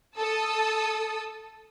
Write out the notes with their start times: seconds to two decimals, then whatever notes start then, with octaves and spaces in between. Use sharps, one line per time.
0.17 A4 A5 D#6 E6